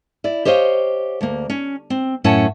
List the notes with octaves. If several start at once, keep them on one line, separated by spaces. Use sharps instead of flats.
E4 D5
G4 C5 C#5 D#5 F5
D2 A#3
C#4
C4
F#2 A2 C#4 E4 F#5 A5